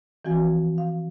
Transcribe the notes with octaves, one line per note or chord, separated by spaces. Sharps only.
E3 F3 C4 F#4 G#5 G#6
F5